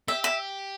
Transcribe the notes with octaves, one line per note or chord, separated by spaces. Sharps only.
G4 E5
E5